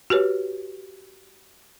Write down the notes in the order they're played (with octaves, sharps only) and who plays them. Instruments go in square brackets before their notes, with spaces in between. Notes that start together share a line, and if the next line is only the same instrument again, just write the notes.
[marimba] F#4 G4 B4 C#5